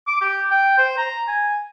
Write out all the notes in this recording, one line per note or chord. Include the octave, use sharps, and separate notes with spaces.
D6
G4
G5
C5
A#5
G#5